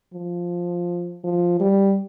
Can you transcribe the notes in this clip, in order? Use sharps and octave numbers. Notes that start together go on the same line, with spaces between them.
F3
F3
G3